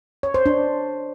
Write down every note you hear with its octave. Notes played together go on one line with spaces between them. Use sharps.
C#5
C5
D4